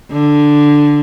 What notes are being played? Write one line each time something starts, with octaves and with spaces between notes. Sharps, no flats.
D3